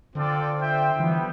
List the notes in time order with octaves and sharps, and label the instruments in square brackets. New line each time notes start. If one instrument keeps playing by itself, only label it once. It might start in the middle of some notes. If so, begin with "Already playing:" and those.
[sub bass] D3 [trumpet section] C4 F4 A4 D5 G5
[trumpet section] F4 C5 E5 G5
[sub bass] E3 [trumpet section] G3 B3